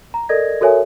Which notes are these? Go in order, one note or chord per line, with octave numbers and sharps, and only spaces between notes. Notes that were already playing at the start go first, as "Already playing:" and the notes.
A#5
A4 A#4 D5 D#5 G#6 A#6
F#4 A4 A#4 C#5 E5 G#5